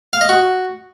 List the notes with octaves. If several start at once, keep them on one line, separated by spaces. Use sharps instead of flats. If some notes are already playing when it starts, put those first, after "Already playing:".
F5
D#5
F#4